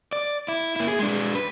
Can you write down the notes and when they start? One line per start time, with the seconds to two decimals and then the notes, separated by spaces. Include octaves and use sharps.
0.12 D5
0.48 E4
0.76 A#3 E4
0.87 G#4
0.99 G#3 D4
1.35 B4